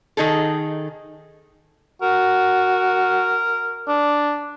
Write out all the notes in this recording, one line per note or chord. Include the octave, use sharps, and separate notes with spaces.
D#3 D#4 G#4 A4
F#4 A#4
D4